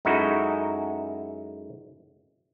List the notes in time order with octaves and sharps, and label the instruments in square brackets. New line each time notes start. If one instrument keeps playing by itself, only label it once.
[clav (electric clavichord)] F#2 G#3 D#4 E4 F#4 A4